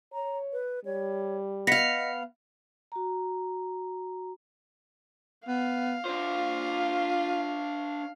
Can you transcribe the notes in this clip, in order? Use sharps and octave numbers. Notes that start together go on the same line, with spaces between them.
C#5 A#5
B4
G3 C#5
B3 D#5 F5 A#6 B6 C#7
F#4 A#5
B3 F5
D4 F4 C5